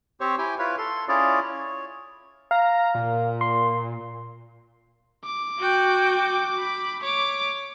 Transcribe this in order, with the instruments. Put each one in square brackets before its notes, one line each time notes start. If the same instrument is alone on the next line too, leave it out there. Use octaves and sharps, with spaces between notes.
[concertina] C4 G4 C5 C#5 C#6
E4 G4 G5 G#5
E4 F4 B4 C#5
A4 C6
C#4 E4 F4 G#4 C#5 D5
C#5
[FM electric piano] F5 [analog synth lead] A#5
[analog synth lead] A#2
[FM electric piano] C6
[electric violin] D6
[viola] F#4 G5
B5
[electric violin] C#5 [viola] D6